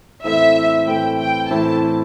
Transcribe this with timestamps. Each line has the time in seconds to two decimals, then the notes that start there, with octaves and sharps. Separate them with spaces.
0.24 A2 E3 C4 E4 A4 E5
0.87 A2 E3 C4 E4 A4 G5
1.18 G5
1.50 A2 E3 C4 E4 A4 A5